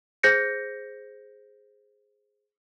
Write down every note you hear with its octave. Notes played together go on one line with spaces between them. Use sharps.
G#4 C5 G6 A#6 C#7